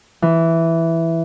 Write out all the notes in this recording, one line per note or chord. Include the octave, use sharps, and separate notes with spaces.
E3